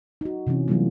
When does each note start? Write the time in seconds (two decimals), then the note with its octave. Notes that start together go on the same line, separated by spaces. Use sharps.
0.21 D#4 F#4
0.47 C3 E3 C4 C#4
0.68 E3 F#3 G3 A3 B3 F4